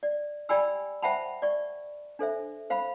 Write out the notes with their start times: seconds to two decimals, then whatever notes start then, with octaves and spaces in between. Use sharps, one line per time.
0.03 D5
0.49 G4 D5 G5 G#5 B5 E6
1.02 C5 E5 F#5 G5 A5 B5
1.42 D5 C#6
2.19 D4 A4 C5 E5
2.70 C5 F5 B5